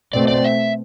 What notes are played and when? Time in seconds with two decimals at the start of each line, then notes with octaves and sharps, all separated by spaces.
0.13 B2 A3 C4 D5
0.28 D5
0.44 E5